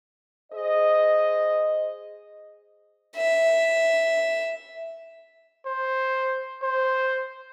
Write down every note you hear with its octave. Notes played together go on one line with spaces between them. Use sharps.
G#4 C5 D#5
E5
C5
C5